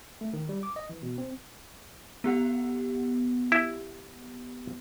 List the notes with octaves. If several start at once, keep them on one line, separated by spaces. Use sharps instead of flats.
A3
D#3
G3
D6
D#5
E3
B2
C4
B3 G4 F#5
E4